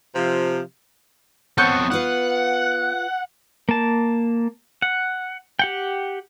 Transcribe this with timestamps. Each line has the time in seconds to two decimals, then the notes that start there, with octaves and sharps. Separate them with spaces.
0.15 C3 F3
1.58 B3 C4 A4 C#5 C#6 G6
1.92 F4 B4 F5 F#5
3.69 A#3 A5
4.82 F#5
5.59 G4 F#5 G5